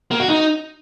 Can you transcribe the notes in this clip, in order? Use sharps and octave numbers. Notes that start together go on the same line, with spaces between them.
A#3
F#4
D#4